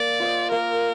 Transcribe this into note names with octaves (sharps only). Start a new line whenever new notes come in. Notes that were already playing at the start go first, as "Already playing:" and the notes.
Already playing: A#3 D5
F4 C5 D#5
A#3 A#4